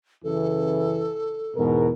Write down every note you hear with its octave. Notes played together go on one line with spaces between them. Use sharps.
F#2 C#3 E3 A4
E2 G#2 B2 A#4